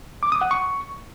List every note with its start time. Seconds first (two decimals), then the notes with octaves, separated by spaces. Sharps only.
0.23 D6
0.32 D#6
0.41 F#5
0.51 C#6